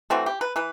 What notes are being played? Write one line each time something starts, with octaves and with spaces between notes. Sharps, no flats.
E3 A3 C4 F#4
G4
B4
E3 B4